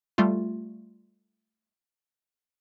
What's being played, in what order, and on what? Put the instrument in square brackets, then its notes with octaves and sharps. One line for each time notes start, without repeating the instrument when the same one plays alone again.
[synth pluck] G3 A3 F4